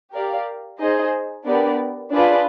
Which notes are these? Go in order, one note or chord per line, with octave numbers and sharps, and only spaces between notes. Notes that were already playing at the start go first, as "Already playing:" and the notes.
G4 A#4 D5 F5
D#4 G#4 C5 D#5
B3 D4 G4 A#4 D5
D4 F4 G#4 B4 D5